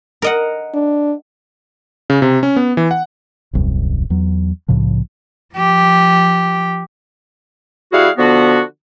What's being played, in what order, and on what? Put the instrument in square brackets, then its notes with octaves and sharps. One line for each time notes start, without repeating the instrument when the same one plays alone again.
[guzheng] A#4 D#5 F#5
[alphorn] D4
[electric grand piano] C#3
C3
C#4
B3
E3
F#5
[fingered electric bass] D#1 C2 F#2
E2 F#3
C2 A2 C#3 F3
[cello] F3 G4
[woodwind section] G3 E4 F#4 G#4 F5 F#5
D3 F3 B3 F#4